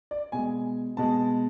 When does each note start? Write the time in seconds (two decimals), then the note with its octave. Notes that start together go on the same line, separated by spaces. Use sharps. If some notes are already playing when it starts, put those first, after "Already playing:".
0.11 D5
0.32 B2 G#3 G#5
0.97 B2 G#3 A5